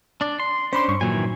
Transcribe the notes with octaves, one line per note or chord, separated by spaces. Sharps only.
D4 D5
C6
C#4 D4 C5 B5 C6
G2 C#6
A#2 D#3 E3 F#3 G#5